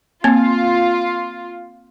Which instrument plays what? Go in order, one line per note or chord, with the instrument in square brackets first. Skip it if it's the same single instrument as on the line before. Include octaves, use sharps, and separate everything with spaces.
[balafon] A#3 C4 [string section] F4